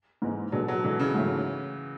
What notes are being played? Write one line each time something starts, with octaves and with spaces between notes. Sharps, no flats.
G#2 E3 G#3
B2 F#3 G#3 D4 A4
F#3
B2 E3 G#3 D4 A4
C#3
G#2 F#3 A3 C#4 E4